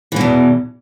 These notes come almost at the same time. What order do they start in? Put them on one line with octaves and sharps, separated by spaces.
E3 B2 E2